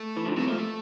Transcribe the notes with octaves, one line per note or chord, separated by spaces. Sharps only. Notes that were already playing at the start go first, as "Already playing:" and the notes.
Already playing: A3
E3
D3 F3
C3 E3 A3
F3 A3 A#3
A3